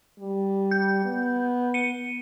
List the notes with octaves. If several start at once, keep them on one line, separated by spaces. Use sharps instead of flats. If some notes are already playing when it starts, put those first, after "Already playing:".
G3
G6
B3
C#7 D#7